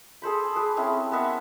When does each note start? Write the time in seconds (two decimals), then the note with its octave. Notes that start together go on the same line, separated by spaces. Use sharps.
0.22 G#4 A4 C5 B5
0.56 G#4 B4 D6
0.77 C4 C#4 E4 A5
1.12 B3 A#4 E5 F#5